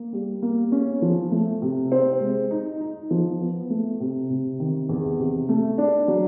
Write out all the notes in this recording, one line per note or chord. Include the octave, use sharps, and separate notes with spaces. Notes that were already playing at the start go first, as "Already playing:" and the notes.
Already playing: A#3
G3
A#3
C#4
F3
A3
C3
C4
G#3
D#4
D#4
F3
B3
A3
C3
C3
D#3
E2
C3
A3
D4
F#3